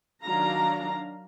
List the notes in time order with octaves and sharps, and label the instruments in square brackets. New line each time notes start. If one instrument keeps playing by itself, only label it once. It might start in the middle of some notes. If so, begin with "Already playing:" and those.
[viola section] D#3 F#3 D4 F5 A#5